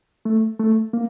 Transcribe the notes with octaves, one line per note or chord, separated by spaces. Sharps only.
A3
A3
A#3